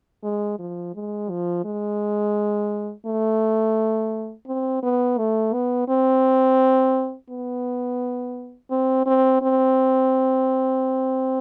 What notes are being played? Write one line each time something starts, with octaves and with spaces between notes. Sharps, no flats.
G#3
F3
G#3
F3
G#3
A3
C4
B3
A3
B3
C4
B3
C4
C4
C4